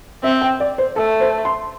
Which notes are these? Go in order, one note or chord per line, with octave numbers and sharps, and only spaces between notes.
C4 E5
G5
D5
C5
A3 A4
C5
C6